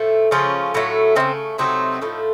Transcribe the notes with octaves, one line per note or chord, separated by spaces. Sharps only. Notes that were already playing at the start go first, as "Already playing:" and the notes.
Already playing: A2 F3 A3
C#3 F3 A3 C#4 F4
A2 F#3 A3
C#3 A3 C4 D#4
C3 F#3 A3 C4 D#4
A2 F3 A3